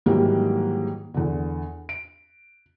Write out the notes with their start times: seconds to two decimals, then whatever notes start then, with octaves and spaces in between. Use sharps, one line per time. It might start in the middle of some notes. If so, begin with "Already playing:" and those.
0.06 G#2 D#3 E3 F#3 G3 A#3
1.14 E2 D3
1.89 D7